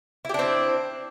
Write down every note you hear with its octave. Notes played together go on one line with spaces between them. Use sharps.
C4 D4 E4 G4